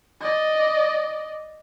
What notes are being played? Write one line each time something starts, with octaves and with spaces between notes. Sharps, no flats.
D5 D#5